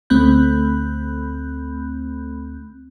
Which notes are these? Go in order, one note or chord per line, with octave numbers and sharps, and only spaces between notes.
D2 A3 C4 B5 F#6 G6